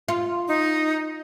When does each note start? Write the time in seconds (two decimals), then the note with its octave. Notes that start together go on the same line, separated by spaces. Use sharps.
0.08 F4
0.48 D#4